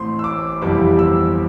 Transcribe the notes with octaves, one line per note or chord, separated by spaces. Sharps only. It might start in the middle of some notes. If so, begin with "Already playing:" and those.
Already playing: A1 A2 E3 A3 C4 C6
E6
D6
G1 F2 C3 E3 G3 D6
E6